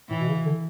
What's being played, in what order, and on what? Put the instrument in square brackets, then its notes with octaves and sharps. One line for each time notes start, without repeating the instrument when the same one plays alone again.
[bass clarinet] A2 [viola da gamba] E3
[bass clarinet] B2
C#3
D3